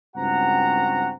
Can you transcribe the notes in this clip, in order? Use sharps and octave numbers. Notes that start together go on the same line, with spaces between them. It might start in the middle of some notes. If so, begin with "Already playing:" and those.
C#2 G2 C4 F#4 F#5 A#5